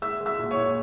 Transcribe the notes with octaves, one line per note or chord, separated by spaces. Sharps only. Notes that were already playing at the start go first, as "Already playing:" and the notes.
G#3 E5 E6
G#3
E5 E6
A#2
C#5 C#6
A#2